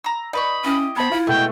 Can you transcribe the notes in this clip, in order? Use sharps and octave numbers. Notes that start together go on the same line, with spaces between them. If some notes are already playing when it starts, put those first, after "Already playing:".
A#5 E6
D#4 B4 D5 B5 C#6
C#4 E4 G4 D#5
B3 C5 A5 B5 G#6
E4 F4
B2 G#3 A3 B3 G5